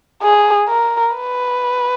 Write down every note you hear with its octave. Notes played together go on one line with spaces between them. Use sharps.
G#4
A#4
B4